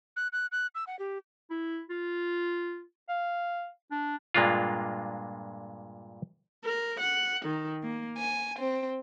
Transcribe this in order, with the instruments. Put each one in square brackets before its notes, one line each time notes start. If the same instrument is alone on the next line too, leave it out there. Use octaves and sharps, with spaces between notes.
[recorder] F#6
F#6
F#6
E6
F#5
G4
[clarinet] E4
F4
F5
D4
[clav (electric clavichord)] G2 A#2 G#3 A#3 D4 F4
[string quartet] A#4
F#5
D#3
A#3
G#5
C4